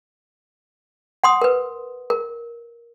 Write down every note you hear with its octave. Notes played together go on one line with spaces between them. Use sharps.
F#5 C6 D#6
A#4 B4
A#4